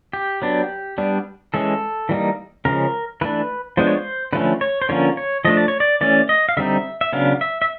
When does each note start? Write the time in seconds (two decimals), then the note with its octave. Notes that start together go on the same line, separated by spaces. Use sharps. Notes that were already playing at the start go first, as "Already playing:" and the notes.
0.13 G4
0.42 F#3 B3 D4
0.98 G3 B3 D4
1.54 E3 G#3 C#4 A4
2.09 E3 G3 A#3 D#4
2.65 C#3 F3 G#3 C#4 A#4
3.21 E3 A3 D4 B4
3.77 F3 G#3 B3 D4 C5
3.87 C#5
3.97 C5
4.33 D3 F3 A3 C#4 B4
4.61 C#5
4.82 C5
4.89 D3 F3 A#3 C#4 C#5
5.17 C#5
5.45 F3 A3 D4 D#5
5.57 D5
5.68 C#5
5.80 D5
6.01 E3 A3 C#4 D5
6.29 D#5
6.49 F5
6.57 D3 G3 C4 D#4 E5
7.01 E5
7.13 C#3 F#3 B3 D4 F5
7.41 E5
7.62 E5